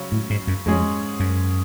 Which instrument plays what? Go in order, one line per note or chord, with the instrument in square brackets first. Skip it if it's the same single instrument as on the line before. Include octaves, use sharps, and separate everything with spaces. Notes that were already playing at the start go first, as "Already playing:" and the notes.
Already playing: [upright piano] C#3 F#3 C#4
[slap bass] A2
G#2
F#2
[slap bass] F2 [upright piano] G#2 G#3 C#4 G#4
[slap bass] F#2